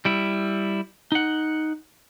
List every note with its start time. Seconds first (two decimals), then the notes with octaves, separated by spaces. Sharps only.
0.05 G3 E4
1.12 D#4 F#5